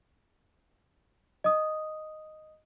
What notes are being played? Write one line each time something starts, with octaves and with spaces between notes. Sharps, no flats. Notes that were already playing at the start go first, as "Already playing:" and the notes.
D#5 D#6